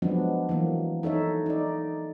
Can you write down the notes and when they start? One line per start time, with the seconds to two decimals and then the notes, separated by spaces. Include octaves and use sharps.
0.02 F3 F#3 G#3 B3 D4
0.49 E3 F#3 A#3
1.03 D#4 A4 C#5 E5
1.46 D#4 D5